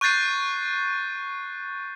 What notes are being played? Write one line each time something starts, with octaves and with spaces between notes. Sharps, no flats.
C#6 F#6 G6 A6 C7 D#7